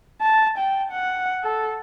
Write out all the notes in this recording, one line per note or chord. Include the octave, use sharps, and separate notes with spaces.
A5
G5
F#5
A4